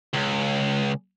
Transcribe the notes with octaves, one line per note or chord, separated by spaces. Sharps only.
C#2